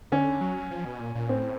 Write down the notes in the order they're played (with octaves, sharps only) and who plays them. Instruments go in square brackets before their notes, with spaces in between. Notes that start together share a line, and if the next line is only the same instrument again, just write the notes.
[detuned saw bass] D3 [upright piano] C#4
[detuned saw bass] F#3
F3
B2
A#2
A#2
[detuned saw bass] A2 [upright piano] C4